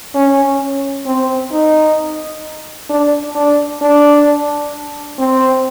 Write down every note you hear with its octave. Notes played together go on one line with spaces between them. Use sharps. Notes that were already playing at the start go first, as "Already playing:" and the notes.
C#4
C4
D#4
D4
D4
D4
C4